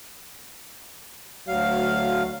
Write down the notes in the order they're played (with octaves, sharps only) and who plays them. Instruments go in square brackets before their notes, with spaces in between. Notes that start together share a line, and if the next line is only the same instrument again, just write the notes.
[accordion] D2 F5 [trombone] F#3